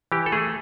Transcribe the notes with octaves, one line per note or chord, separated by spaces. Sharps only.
E3 G4
A4
A3 G#4